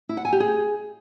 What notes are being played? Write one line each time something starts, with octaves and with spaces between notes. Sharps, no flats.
E4
F#5
G#5
G4
G#4